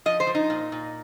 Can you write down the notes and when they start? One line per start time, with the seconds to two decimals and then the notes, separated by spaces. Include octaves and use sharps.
0.06 F3 D#5
0.20 C5
0.27 F3
0.35 D#4
0.50 A#2
0.72 A#2